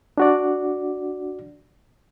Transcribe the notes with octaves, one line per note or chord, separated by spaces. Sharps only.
D4 F#4 D5